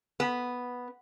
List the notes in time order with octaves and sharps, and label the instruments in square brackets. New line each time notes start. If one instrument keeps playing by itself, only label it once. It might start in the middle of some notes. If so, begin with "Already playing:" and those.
[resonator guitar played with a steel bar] B3